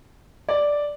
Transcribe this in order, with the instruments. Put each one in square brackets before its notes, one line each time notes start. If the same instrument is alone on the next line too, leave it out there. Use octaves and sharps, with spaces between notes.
[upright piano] D5